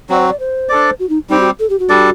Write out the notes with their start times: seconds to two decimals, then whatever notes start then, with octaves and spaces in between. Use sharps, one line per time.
0.09 F#3 C4 F#4 D5
0.20 C5
0.29 D5
0.39 C5
0.69 D4 A4 D5
0.99 F#4
1.09 D#4
1.29 G3 C4 D#4 G4
1.39 F#4
1.59 A4
1.70 G4
1.79 F#4
1.89 G3 D4 A4 D5